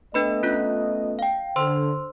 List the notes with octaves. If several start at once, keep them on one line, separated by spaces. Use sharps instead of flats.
A3 B3 D4 B4 D#5 B5
C#4 F4 F#6
F5 G5
D3 C5 C6 E6